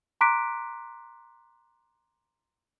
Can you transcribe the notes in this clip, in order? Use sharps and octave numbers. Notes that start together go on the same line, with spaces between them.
A#5 C6 D6 F#6 B6 D7